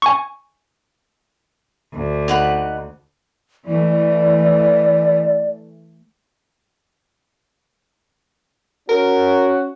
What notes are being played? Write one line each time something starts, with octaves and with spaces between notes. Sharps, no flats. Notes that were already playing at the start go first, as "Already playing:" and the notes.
G#5 C#6
D2
D#4 F#5 B5
E3 A3 D5
C#4 F#4 A#4